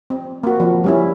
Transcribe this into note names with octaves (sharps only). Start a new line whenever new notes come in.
C4
A#3 F#4
F3
G3 C#4 E4